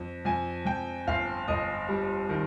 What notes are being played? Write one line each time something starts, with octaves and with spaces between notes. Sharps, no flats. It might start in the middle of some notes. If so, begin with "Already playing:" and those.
Already playing: F2
F2 G#5
F2 G5
G1 F5
G1 D#5
G3
D#3